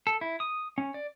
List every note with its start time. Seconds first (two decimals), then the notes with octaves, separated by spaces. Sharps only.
0.07 A4
0.21 E4
0.40 D#6
0.78 C#4
0.94 D5